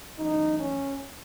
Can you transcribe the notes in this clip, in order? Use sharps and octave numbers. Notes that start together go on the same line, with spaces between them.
F#2 E3 A3 D#4
C#4